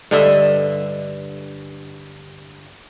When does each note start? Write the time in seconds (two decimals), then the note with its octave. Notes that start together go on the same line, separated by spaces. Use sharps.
0.11 G2 D3 D#5 E5